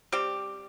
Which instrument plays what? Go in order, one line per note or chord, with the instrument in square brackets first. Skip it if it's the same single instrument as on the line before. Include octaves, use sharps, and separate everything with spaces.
[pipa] G3 C4 G4